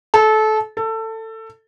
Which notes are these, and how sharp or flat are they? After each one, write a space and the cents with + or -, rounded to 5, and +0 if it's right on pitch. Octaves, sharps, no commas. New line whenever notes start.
A4 -25
A4 +20